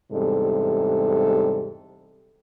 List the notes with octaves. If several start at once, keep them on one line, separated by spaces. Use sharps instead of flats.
E2 G#2 C3 G3 A4